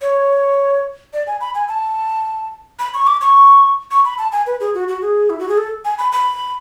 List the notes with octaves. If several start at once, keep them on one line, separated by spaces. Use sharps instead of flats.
C#5
D5
G#5
B5
G#5
A5
B5
C#6
D6
C#6
C#6
B5
A5
G#5
B4
G#4
F#4
F#4
G#4
E4
F#4
G#4
A4
G#5
B5
B5